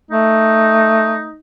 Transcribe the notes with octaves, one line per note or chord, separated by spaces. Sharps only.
A3 D#4